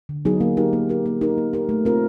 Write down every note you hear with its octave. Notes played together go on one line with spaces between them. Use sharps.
D3
F#3 B3 D#4 G#4
A#3
D#4 G4 A#4
A#3
D#4 G4 A#4
A#3
D#4 G4 A#4
A#3
D#4 G4 A#4
A3
C4 F4 A#4